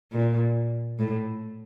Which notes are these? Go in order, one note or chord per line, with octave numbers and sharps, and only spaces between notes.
A#2
A2